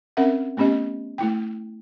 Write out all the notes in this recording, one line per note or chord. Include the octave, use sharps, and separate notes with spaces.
C4 C#4 A#4 E5 F#5
A3 B3 C#4 G4 D#5
A3 E4 G5